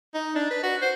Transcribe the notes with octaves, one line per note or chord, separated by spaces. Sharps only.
D#4
D4
B4
F#4
C5